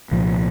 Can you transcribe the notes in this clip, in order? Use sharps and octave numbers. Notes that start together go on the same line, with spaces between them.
C2 A#2 F3